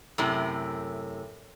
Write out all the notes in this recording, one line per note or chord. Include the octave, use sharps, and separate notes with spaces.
F#2 A2 C3